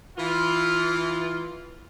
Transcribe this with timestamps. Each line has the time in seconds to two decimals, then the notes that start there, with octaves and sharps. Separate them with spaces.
0.18 E3 F4